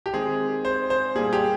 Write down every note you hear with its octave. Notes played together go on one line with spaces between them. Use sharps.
G4
D#3 G#3 C4 G#4
C5
C5
A#2 G3 A#3 G#4
G4